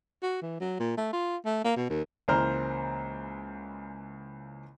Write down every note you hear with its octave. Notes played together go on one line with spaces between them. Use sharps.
F#4
E3
F#3
A#2
A3
F4
A3
A#3
B2
D#2
C#2 E3 A#3 C5 A#5 F6